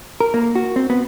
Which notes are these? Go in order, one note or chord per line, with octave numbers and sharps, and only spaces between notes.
A#4
A#3
F#4
C4
B3